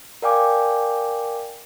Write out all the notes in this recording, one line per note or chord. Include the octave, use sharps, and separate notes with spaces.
A#4 D5 F5 G5 G#5 D6